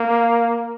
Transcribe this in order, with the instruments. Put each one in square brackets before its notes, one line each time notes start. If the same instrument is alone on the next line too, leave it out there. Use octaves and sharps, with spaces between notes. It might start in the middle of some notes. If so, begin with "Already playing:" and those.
Already playing: [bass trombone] A#3